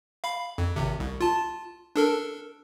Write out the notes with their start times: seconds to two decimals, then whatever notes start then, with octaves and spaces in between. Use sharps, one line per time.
0.24 F5 B5
0.58 F2
0.76 G#1 C3
1.00 C2
1.21 F4 A5
1.96 D4 A4 A#4